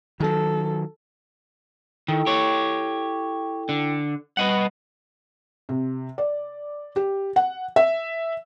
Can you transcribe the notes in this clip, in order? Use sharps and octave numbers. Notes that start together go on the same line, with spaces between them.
D#3 F#3 A4
D#3 E4 A4 G5
G4 C#5
D3
G3 B4 D#5 F#5
C3
D5
G4
F#5
E5